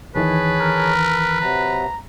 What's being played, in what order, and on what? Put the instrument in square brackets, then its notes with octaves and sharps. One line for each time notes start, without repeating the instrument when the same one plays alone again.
[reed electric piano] D#2 D#3 E3 [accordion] G#4 C#5 A5 [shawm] B4
[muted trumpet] A#4
[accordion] C3 F#3 [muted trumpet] A#5